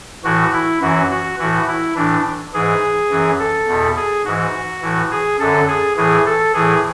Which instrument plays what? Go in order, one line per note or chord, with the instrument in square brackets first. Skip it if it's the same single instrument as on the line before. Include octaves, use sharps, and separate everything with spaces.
[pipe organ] A2 E3 F#4
E4
F#2 E3 F#4
F#4
A2 E3 F#4
E4
A2 E3 D4
G#2 E3 G#4
F#2 E3
A4
E2 B2
G#4
G#2 E3 F#4
A2 E3
G#4
F#2 D3 A4
G#4
A2 E3 G#4
A4
A2 E3 G#4